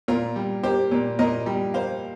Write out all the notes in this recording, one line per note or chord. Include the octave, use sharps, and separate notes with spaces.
A#2 F4 A#4
G3
A#3 G4 C5
A#2
A#2 A#4 D#5
G3
A#3 C5 F5